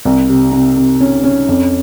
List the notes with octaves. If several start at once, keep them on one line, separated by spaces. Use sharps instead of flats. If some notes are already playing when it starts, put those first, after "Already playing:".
C2
C3
C3
C3
C#4
C#4
F2